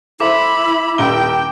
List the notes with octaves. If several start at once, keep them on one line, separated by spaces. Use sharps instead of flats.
E4 A4 C5 E5 B5 D6
D#1 G5 D7 G7